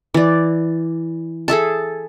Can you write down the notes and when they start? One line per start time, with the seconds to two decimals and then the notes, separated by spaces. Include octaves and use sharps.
0.14 E3 D5
1.48 G#4 A4 E5 A5